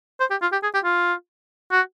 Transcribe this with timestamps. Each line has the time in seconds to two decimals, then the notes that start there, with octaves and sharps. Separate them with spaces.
0.20 C5
0.31 G4
0.42 F4
0.52 G4
0.63 G#4
0.74 G4
0.84 F4
1.72 F#4